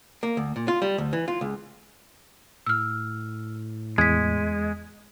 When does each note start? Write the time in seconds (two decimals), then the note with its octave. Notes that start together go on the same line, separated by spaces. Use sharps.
0.23 A#3
0.37 D2
0.56 A#2
0.68 F4
0.82 G3
0.98 D2
1.13 E3
1.28 F4
1.41 C#2
2.66 A2 E6 F6
3.98 E2 G#3 G#6 B6